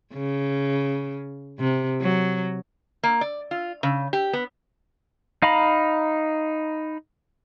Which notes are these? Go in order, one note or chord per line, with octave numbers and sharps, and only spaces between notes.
C#3
C3
F#3
A#3
D5
F4
C#3
G4
B3
D#4 F5 A#5 B5